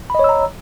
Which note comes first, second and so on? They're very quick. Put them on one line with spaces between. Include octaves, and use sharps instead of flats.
B5 D#5 C#5 E6 A#5